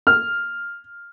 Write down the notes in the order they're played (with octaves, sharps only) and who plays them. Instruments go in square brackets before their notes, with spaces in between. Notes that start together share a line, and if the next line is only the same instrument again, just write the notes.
[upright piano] F6